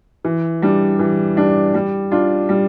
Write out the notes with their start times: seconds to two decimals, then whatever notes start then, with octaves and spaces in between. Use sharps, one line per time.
0.25 E3
0.62 G3 D4
0.99 E3
1.37 G3 D4
1.74 G3
2.11 D4 F4
2.49 G3